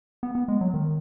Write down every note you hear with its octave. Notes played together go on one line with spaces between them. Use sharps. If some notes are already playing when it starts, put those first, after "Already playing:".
B3
B3
G#3
F#3
D#3